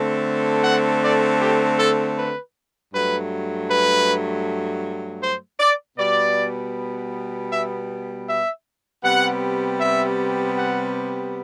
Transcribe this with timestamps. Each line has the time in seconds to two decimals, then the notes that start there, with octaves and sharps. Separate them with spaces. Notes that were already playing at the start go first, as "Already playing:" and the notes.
Already playing: D3 A3 C4
0.64 F#5
1.02 D5
1.40 G4
1.78 A4
2.17 B4
2.93 G2 F#3 A3 B4
3.69 B4
5.22 C5
5.60 D5
5.98 B2 G3 B3 D5
7.51 E5
8.27 E5
9.03 C3 G3 B3 F#5
9.80 E5
10.56 F#5